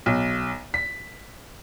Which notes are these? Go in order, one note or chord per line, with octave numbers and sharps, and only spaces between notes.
B1
B6